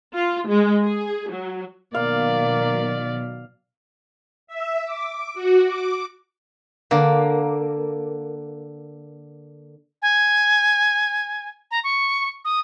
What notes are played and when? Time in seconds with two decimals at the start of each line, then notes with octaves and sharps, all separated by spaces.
0.14 F4
0.48 G#3
0.83 G#4
1.31 F#3
1.94 B2 D#3 F#3 A#3 D5 F5
4.47 E5
4.85 D6
5.34 F#4
5.66 D6
6.91 D3 A#3
10.02 G#5
11.71 A#5
11.84 C#6
12.45 D#6